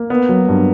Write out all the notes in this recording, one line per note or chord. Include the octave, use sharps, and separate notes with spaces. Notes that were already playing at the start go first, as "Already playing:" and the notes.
Already playing: A#3
B3
F#3
G2